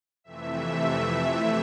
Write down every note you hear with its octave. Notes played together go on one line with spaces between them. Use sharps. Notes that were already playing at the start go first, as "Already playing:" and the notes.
F2 C3 E3 A3 E5